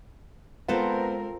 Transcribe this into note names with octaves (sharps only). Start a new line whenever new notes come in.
G#3 B3 C4 F4 A4 A#4 C5